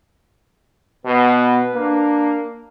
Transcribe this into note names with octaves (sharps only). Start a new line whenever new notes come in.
B2 B3 B4
A#3 D4